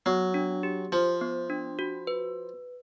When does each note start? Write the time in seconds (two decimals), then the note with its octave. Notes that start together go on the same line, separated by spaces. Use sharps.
0.06 F#3 B3
0.34 D4
0.63 G4
0.92 F3 C5
1.21 B3
1.50 D4
1.79 F#4
2.07 B4